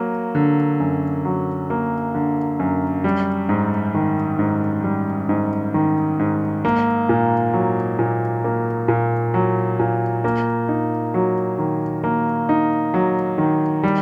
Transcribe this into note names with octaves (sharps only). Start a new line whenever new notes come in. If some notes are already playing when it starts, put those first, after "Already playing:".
Already playing: F#3 A#3
D3
F#2
F#3
A#3
D3
F#2
G3
G#2
D#3
G#2
G3
G#2
D#3
G#2
A#3
A#2
F#3
A#2
A#3
A#2
F#3
A#2
A#3
D#4
F#3
D#3
A#3
D#4
F#3
D#3
G3